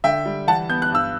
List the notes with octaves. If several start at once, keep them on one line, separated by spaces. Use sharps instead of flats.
D3 E5 G5
G3
E3 F#5 A5
B3 G6
F#6
G2 E6